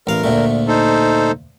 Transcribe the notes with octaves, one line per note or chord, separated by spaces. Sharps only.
A1 A#4 F5
D2 A#2 A3
D#4 A4 C5